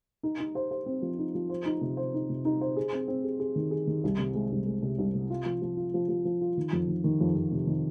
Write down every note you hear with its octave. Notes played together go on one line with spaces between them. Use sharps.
D#4
D#4
C5
C5
C4
F3
D#4
F3
C5
D#4
C3
C5
D#4
C3
D#4
C5
G#4
C4
C4
G#4
G#4
D#3
G#4
D#3
C2
C3
G#3
C2
G#3
C3
C2
C3
F4
F3
F3
F4
F3
F3
F3
F4
D#3
F2
D#3
D#3
F2
F2
C3
D#3